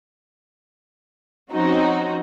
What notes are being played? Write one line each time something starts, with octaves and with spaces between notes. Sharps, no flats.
F3 C4 C#4 D#4 F#4